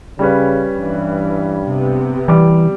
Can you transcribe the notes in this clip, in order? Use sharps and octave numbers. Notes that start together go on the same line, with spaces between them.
C#3 G3 C#4 B4
G2 E3
C3 B3
E3 G3 D6